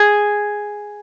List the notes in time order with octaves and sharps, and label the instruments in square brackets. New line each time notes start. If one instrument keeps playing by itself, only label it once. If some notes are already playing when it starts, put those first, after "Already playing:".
Already playing: [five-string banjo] G#4